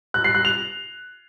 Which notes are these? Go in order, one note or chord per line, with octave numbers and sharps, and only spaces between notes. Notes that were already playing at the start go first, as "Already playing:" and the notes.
F#6
C7
F#6
F7